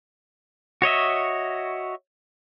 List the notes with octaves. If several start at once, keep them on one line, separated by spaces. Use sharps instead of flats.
F#4 C#5 D#5 E5